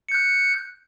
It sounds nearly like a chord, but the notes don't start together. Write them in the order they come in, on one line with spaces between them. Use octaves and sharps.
C#7 G6 F#6